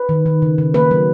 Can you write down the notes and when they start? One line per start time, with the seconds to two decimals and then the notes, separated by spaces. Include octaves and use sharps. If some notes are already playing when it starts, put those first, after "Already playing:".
Already playing: B4
0.09 D#3
0.26 D#3
0.42 C#3
0.58 C#3
0.74 A#3 B4
0.91 F#3